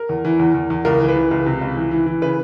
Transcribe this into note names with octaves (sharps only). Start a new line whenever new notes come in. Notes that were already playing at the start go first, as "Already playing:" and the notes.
Already playing: A#4
E2
E3
E2
E2
E2
C#2 A#4
E3
B4
E3
C#2
C3
C#2
E3
E3
E3
C#3 B4